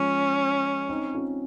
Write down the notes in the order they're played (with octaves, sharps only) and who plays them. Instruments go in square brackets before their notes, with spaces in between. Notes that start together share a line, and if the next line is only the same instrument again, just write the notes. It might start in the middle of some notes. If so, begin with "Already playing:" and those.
Already playing: [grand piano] F3 G#3 [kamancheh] C#4
[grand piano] C4 D#4
C#4 F4